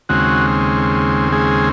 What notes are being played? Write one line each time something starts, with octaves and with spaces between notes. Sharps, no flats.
D#2 C#3 G#3 C4 F#4
G#3 G#4